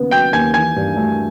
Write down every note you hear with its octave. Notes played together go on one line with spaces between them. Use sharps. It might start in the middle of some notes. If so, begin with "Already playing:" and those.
Already playing: D#2 C#3 B3
F#3 G5 G6
D#2 G#5 G#6
E3 G#5 G#6
G2
A3